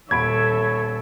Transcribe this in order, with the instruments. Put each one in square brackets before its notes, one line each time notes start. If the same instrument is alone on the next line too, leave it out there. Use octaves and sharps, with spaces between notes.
[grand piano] D#1 B5 D7 [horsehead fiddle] A4 E5 [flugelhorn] C#5 [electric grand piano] G#6